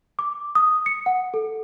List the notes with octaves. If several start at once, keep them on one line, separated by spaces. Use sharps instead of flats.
D6
D#6
C#7
F#5
A4